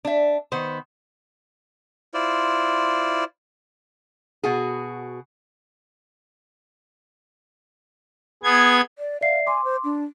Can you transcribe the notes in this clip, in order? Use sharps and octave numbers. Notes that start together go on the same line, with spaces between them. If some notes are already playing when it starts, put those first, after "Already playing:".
D4 E5
D#3 B3 C5
E4 F4 C5 D5
B2 F#4 G#4
B3 G#4 G#6
D5
D5 E5 F5 C7
G#5 C6 D6
C5
D4